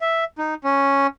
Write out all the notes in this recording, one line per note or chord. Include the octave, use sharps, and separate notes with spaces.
E5
D#4
C#4